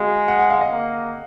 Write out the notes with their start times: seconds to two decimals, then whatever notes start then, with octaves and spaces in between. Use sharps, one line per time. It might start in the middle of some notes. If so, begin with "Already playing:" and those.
Already playing: G#3 F#4 G#4 F5
0.28 F#5
0.39 F#5
0.50 F5
0.61 D#5
0.72 A#3